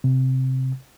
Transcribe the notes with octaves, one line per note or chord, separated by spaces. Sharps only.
C3